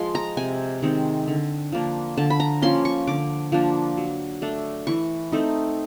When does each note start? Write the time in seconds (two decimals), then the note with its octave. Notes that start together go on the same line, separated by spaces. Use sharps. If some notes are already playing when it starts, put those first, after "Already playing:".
Already playing: F3 G#3 C6
0.15 A#5
0.37 C3 G#5
0.82 D#3 G#3 C4
1.28 D3
1.72 F3 A#3 D4
2.18 D3 A5
2.30 B5
2.40 A#5
2.62 F3 A#3 C#4 C6
2.85 C#6
3.07 D3 D6
3.52 F3 A#3 D4
3.97 F#3
4.42 A3 D4
4.87 E3 C#6
5.32 A3 C4 D#4